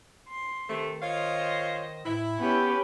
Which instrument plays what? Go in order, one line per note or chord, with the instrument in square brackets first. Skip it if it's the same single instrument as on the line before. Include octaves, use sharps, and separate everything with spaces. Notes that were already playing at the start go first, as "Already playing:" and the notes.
[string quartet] C6
[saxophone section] C3 A3 [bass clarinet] D#3
[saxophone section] F4 C#5 F5 [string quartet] C5 D#5
[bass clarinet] A2 [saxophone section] E4
[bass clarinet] B3 [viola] C#4 G4 [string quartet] B4 C#5 B5